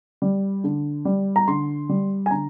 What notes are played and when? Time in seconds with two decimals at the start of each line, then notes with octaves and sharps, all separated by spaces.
0.22 G3
0.64 D3
1.05 G3
1.36 A#5
1.48 D3 C6
1.89 G3
2.26 G#5
2.31 D3 A#5